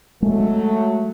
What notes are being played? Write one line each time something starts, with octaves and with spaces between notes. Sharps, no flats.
F#3 G#3 A3